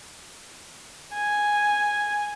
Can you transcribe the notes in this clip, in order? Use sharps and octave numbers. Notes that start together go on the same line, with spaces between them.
G#5